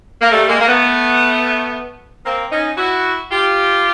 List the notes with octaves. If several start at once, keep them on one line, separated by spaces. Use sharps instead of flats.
A#3
G3 A3
G#3 A#3
A#3
A3 B3
A#3 C4
C#4 D#4
E4 F#4
F4 G4